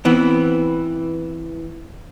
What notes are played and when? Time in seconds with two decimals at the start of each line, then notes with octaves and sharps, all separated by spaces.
0.05 E3 B3 C4